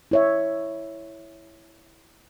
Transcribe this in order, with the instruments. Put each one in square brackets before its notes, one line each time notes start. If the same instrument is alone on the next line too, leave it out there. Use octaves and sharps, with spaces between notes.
[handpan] E4 C#5 E5